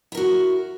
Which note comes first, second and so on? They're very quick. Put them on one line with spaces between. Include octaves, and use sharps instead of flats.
E4 A#4 F#4